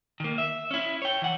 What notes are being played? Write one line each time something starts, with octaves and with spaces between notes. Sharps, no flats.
D#3 A#3
E5
C#4 E4
C#5 G5
E3 F#5